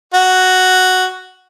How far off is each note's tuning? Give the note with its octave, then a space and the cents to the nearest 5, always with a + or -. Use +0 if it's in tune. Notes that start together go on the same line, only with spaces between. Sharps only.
F#4 +0